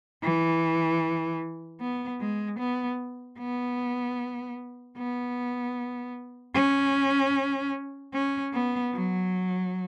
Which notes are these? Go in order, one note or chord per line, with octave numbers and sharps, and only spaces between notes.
E3
B3
G#3
B3
B3
B3
C#4
C#4
B3
F#3